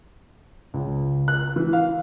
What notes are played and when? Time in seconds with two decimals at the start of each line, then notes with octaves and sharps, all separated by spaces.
0.74 C#2
1.28 F#6
1.56 E3
1.73 F5